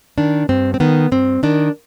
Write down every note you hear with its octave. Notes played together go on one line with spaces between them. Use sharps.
D#3 D4
G2 C4
C4
D#3 B3
G2 C4
D#3 D4